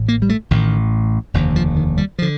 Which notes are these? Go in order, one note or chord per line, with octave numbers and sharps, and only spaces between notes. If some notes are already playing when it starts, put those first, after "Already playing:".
Already playing: A1 A2
A#3
G3
A3
A1 A2 D#3
F1 D#2 D3
F3
D#3
G3
F3
D3